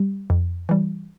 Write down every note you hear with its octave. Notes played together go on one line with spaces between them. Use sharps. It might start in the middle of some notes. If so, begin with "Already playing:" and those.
Already playing: G3
F2
E3 G3